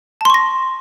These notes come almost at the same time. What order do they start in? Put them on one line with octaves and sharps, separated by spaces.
A5 C6 C#6 A#6